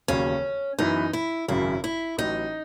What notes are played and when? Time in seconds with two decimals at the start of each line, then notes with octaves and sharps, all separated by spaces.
0.08 E1 D#2 C#3 F#3 C#4
0.79 F#2 E3 B3 D#4 E4 B4
1.13 E4
1.48 G#1 F#2 C#3 F#3 E4
1.84 E4
2.18 A1 A2 F#3 D#4